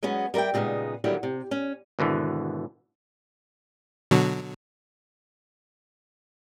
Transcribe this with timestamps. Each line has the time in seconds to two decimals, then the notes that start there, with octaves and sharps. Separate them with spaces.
0.03 F#3 G#3 B3 C#4
0.34 G3 A#4 B4 E5 G5
0.54 A#2 C#3 G#3 B3 D#4
1.04 D3 D#3 F#3 G3 A#3 E4
1.23 C3
1.51 C#4
1.99 G#1 B2 D3 E3
4.11 B2 D3 F#3